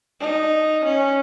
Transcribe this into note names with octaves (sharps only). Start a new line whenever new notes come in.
D#4
C#4